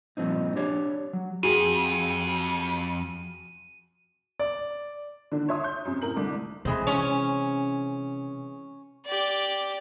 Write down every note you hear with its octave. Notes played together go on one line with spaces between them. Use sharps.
G2 A#2 C#3 F3 C4 D#4
D4 G4 C#5 D5
F#3
F2 F#4 G#4 D#7
D5
D3 D#3 D4
C#5 E5 C6 D#6
G6
F#2 C3
A2 C3 E4 A#4 F#7
C2 D3 A3 D6
C3 E3 G#3 C5
C#4
G4 D5